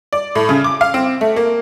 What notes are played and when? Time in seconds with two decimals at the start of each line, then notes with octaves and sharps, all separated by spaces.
0.13 D5
0.35 A2
0.49 C#3
0.64 D6
0.81 F5
0.94 C4
1.21 A3
1.36 A#3